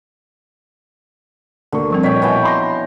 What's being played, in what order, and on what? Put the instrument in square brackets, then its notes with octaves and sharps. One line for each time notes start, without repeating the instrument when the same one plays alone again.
[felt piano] D2 A#3 C#6 [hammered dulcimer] D3
[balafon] F3 G3 C4
[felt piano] A#2 D#5 B6 [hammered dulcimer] C#5 G5
[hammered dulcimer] B2 E3 G5
[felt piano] B5 C6 A#6